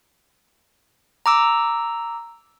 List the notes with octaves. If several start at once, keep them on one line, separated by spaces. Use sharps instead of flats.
A#5 D6 E6